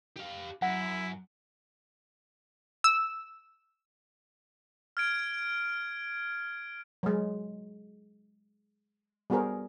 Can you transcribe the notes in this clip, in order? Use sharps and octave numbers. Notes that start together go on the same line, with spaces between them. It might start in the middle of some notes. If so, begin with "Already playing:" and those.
G4 F5
F#2 E4 F#5
E6
F6 G#6 D7
F#3 G#3
G3 B3 F#4 G#4 A#4 C5